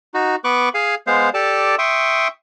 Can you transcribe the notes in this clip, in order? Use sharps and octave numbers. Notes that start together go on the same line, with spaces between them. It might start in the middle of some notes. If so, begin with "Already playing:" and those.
D#4 F#4
B3 B4 C#6 D6 F#6
G#4 F5 G#5
G#3 B3 C5 F5
G4 A4 D5 A5
E5 G5 C6 C#6 D#6